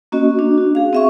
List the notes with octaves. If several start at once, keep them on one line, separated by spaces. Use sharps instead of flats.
A#3 C#4 F#4 D#5
D4
F#4
G#4 F5
C4 E5 C#6